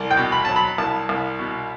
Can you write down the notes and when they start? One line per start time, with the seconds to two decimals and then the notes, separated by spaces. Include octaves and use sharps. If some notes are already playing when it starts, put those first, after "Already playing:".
Already playing: C2
0.11 G5
0.17 B2
0.32 B5
0.45 F#3 A5
0.56 B5
0.78 C2 A5
1.09 C2
1.39 B2